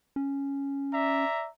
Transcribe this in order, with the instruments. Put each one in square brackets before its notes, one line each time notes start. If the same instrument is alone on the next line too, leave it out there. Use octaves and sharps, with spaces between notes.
[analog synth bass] C#4
[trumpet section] D5 E5 A#5